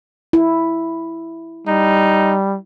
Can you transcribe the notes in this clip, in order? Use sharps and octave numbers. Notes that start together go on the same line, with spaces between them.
E4
G3 D#4